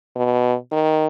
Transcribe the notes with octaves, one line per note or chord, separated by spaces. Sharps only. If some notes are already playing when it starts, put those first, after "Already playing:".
B2
D#3